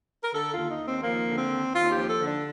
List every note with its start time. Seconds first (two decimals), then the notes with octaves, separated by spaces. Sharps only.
0.24 A#4
0.34 D3 A4
0.52 D#2 F4
0.69 D#4
0.81 D#2
0.87 C4
1.03 F3 A#3
1.27 D3
1.38 C4
1.50 D#2
1.73 D#2 F4
1.91 G4
1.97 F3
2.08 A4
2.19 D3
2.26 D4